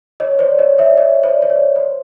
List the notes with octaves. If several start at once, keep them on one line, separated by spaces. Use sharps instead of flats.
C#5 D#5
C5 D5
C#5 D#5
D5 E5
C#5 D#5
C5 D5
D5
C#5
C5